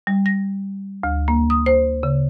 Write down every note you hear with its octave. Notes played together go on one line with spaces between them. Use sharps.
G3
A#6
D2
A#3
D#6
C5
C#3